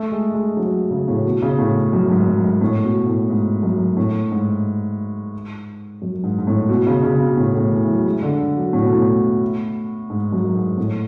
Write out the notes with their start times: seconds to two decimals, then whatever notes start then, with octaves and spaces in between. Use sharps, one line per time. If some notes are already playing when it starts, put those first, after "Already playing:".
Already playing: A3
0.12 G#3
0.34 G#3
0.57 F#3
0.91 C#3
1.08 A2
1.25 B2
1.42 C#3
1.59 A2
1.93 F#2
2.10 G#2
2.27 F#2
2.44 G#2
2.61 A2
2.84 B2
3.06 A2
3.29 G#2
3.63 F#2
3.97 A2
4.32 G#2
6.02 F#2
6.24 G#2
6.38 G#2
6.47 A2
6.69 B2
6.87 C#3
7.04 C#3
7.20 B2
7.37 A2
7.55 A2
7.72 E3
7.88 F#3
8.05 G#3
8.22 D3
8.57 F#3
8.73 A2
8.82 B2
8.93 A2
10.10 G#2
10.32 F#2
10.55 G#2
10.78 A2